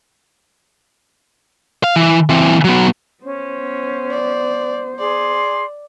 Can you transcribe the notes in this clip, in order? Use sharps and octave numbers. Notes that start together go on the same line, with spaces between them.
F5
E3
E3 C4
F#3 B3
B3 C#4 C5
D5
G#4 D5 C6